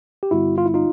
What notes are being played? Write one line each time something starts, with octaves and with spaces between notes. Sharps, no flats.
G4
G2 D3 G3 B3 E4 F#4
F4
E4
D#4 F4